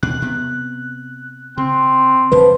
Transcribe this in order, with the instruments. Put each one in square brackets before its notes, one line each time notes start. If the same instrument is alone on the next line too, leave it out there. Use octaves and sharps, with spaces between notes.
[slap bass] D#2 B2 [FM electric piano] F#6
[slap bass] C3 B3
[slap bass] C#3 [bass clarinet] C4
[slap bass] E2 C3 D#3 [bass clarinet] F3 [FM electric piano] B4